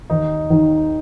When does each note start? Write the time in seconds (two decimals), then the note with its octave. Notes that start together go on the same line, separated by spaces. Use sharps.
0.10 D#2 D#3 D#4
0.50 D#2 D#3